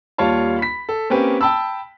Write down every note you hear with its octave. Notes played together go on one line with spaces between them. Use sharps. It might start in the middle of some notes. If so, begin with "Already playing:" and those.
D#2 G3 F4 C#5 F5 A5
B5 B6
A4
A#3 C4 C#4 G4 B4
G5 A5 B5 E6